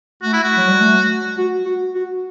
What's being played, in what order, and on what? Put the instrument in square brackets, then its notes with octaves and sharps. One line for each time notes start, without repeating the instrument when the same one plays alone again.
[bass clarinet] A3 [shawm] F#4
[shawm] E4
F#4
[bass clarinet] F#3
G3
A3
F#4
F#4
F#4